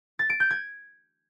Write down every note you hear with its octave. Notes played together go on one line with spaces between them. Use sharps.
A6
D7
G6
G#6